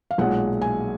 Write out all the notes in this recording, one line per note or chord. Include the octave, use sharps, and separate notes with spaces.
F5
B1 A#2 G#3 F#5
G#5